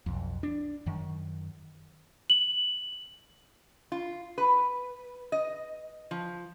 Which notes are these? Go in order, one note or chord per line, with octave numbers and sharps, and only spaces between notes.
B1 F2
D4
F#2 D#3
F#7
F4
B4
D#5
F3